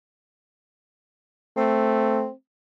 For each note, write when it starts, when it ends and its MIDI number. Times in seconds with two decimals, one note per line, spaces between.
1.57 2.28 57
1.57 2.32 60